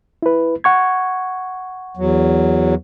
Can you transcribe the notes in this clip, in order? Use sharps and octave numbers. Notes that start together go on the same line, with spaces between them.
E4 B4
F#5 C#6 G#6
E2 F#3